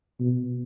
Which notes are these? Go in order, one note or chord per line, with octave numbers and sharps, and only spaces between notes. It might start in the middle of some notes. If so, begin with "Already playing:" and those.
B2